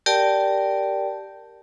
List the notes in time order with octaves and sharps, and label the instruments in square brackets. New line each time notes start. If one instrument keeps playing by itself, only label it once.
[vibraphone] G4 A#4 D5 G5 A5